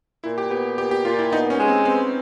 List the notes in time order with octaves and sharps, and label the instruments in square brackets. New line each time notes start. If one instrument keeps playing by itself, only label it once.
[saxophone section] A#2 [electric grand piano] E4
[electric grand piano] G4
[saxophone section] B3 [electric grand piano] G4
[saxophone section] A#2 [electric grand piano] G4
[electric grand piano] G4
[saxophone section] A#2 [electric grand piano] F4
[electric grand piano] E4
[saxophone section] B3 [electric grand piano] D#4
[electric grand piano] C#4
[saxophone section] G#3
[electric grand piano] C4
[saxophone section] B3 [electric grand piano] C4